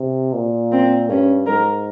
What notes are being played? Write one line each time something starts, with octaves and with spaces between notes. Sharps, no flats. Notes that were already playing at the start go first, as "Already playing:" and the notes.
Already playing: C3
A#2
C4
G2 C#4
G#2 A#4